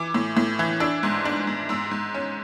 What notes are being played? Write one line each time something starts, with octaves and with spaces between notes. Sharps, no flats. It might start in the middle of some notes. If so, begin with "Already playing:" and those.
Already playing: E3 D6
A2
A2
E3
D4 E6
G#2
D4
G#2
G#2 E6
G#2
C#4